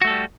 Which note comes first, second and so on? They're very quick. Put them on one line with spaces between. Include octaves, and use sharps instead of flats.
F#4 A3 A4 G3